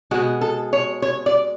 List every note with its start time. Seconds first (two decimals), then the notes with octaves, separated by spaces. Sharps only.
0.11 B2 G#3 F#4
0.41 A4
0.73 C#5
1.02 C#5
1.26 D5